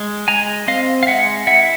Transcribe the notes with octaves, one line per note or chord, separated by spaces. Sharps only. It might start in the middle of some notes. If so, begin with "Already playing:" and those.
Already playing: G#3
G#3 G#5 A#5
C4 D#5 F5
F5
G#3 E5 F#5
E4 E5 F#5